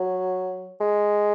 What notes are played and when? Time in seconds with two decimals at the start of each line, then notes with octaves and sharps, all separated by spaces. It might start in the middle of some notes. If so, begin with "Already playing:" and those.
Already playing: F#3
0.80 G#3